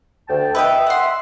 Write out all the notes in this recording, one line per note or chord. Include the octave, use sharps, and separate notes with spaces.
D2 G5 A5
B4 D#5 E5 G5
F#5 C6